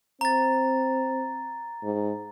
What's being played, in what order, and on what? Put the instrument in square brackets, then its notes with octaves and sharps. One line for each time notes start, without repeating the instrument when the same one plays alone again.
[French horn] C4 [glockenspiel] A#5 A6
[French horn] G#2